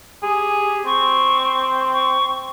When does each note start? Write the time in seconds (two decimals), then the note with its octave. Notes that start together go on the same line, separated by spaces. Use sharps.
0.23 G4 G#4
0.85 C4 C#6
1.93 C#6